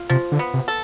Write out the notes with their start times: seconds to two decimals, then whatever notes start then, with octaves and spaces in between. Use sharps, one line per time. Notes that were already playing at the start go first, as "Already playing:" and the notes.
Already playing: F4
0.10 C3 F3
0.32 D3
0.39 B3
0.54 C3
0.68 A4